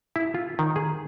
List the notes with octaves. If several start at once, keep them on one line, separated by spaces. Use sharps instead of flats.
E4
F4
D#3
G#4